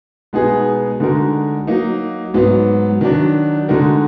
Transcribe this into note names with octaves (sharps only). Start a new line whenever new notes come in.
B2 G#3 B3 D#4 G#4
D3 G#3 D#4 F#4 A#4
F#3 A#3 D#4
G#2 F#3 B3
D#3 F#3 D4
D3 G#3 D#4 F#4 A#4